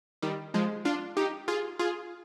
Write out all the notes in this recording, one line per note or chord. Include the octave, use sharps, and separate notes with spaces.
D#3 G3
F3 G#3
D4 F4
D#4 G4
F4 G#4
F4 G#4